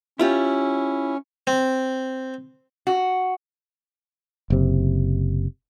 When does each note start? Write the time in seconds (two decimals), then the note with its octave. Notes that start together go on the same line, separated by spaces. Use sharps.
0.19 C#4 E4 F4 G4
1.47 C4
2.87 F#4
4.50 F#1 C3